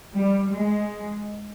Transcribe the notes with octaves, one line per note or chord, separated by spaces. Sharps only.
G3
G#3